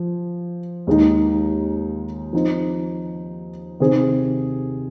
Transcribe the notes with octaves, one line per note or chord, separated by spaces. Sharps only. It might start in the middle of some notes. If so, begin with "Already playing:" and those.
Already playing: F3
D#2 D#3 G#3 D#4
F3 C4 D#4
C3 D#3 C4 G#4 C5